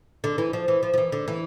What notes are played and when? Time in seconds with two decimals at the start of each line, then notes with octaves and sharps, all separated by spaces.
0.24 D3
0.38 E3
0.53 F3
0.68 E3
0.83 F3
0.94 F3
0.98 E3
1.12 D3
1.28 E3